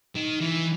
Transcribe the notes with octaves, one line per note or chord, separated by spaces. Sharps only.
D#3
E3